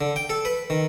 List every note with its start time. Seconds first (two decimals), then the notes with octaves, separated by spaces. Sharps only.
0.01 D3
0.16 G5
0.30 A4
0.45 B4
0.70 D#3